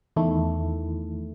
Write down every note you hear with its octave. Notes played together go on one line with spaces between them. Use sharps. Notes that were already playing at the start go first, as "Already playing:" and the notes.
E2 D#3 A3 E4